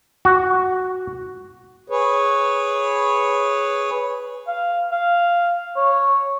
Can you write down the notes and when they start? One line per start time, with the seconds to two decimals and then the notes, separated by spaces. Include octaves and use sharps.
0.25 F#4
1.90 G#4 B4 C#5
4.48 F5
4.92 F5
5.76 C#5